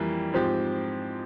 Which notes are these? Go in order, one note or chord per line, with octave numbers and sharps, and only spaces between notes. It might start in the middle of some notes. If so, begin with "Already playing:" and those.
Already playing: F2 E3 G3 A#3
G#2 F3 C4 G4